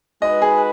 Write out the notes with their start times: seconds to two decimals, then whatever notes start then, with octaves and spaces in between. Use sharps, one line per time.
0.22 G#3 D#4 F#4 B4 D#5
0.42 G#4